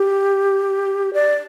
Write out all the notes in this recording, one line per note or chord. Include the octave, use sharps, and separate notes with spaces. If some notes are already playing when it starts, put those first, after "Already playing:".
Already playing: G4
D5